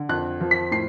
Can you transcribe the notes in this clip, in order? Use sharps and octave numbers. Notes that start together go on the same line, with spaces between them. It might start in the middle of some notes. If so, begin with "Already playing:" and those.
Already playing: D3
F2 F#6
F3
B6
A2 C7